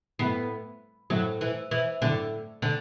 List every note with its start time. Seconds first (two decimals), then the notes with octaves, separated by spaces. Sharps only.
0.19 A2 A3 B3 E4
1.10 A2 F#3 A3 E4
1.41 E3
1.71 E3
2.02 A2 D3 A3 E4
2.62 D3